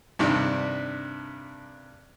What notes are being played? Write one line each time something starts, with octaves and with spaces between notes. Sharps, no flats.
G2 C3 D#3 D4